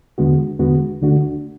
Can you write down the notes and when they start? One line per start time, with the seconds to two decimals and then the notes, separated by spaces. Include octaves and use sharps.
0.18 E2 D3 G#3 B3 F#4
0.59 E2 D3 G#3 B3 F#4
1.01 D2 D3 A3 D4 F#4